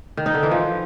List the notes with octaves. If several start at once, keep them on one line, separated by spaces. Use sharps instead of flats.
D#3
D#4
D3
E3
F3